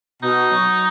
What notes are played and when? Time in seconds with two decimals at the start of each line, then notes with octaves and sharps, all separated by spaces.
0.23 B2 D#4
0.51 F#3